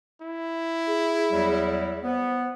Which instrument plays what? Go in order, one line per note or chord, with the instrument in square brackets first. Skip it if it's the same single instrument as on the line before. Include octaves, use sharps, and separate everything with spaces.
[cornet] E4
[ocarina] G#4
[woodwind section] E2 F#3 G3
[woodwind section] B3 [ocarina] C5